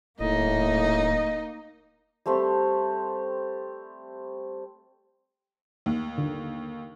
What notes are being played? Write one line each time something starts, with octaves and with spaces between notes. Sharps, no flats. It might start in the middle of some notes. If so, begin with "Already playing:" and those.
D#1 A2 A#3 D#4 D#5
G3 A3 C4 G4
D#2
D3